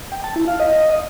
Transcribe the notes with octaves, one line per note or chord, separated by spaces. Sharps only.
G5
A5
E4
F5
D#5